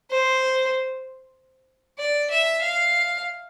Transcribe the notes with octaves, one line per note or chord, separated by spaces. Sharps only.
C5
D5
E5
F5